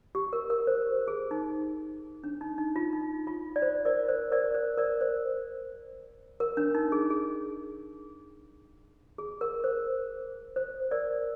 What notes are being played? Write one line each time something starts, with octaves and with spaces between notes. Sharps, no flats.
G4
A#4
A#4
C5
G#4
D#4
D4
D#4
D#4
F4
D#4
F4
D5
C5
A#4 D5
C5
A#4 D5
C5
A#4 D5
C5
A#4
D4
D#4
G#4
G#4
G#4
A#4
C5
C5
A#4 D5